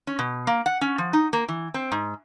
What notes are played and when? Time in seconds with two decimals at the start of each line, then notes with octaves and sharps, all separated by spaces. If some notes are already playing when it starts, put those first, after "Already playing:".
0.07 C#4
0.19 B2
0.47 A#3
0.66 F#5
0.81 C#4
0.98 F3
1.13 D#4
1.33 A#3
1.48 E3
1.74 C4
1.92 G#2